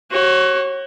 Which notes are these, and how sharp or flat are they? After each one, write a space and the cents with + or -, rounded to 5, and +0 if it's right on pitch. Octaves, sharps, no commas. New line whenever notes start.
F#4 +25 C#5 -30